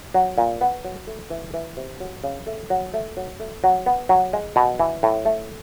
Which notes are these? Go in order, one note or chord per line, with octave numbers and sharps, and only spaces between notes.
F#3
A#2
B3
F#3
A3
E3
E3
C3
F#3
C#3
A3
F#3
A3
F#3
A3
F#3
B3
F#3
G#3
B2
E3
A2
A3